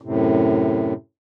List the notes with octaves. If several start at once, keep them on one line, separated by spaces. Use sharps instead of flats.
F#2 A2 C3